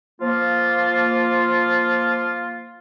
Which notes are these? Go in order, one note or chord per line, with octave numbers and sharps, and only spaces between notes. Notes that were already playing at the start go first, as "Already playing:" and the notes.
F3 A#3 F4